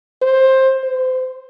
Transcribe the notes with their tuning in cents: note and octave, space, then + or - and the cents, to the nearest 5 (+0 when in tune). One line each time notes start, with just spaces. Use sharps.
C5 +15
C5 -30